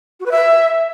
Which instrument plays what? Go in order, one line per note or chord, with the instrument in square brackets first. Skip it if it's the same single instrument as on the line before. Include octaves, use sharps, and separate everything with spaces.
[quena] F#4
B4
E5